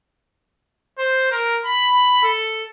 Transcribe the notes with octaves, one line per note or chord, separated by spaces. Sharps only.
C5
A#4
B5
A4